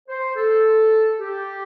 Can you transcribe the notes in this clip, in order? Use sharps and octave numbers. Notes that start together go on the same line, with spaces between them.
C5
A4
G4